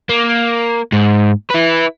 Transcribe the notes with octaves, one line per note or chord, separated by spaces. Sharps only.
A#3
G#2
E4 B4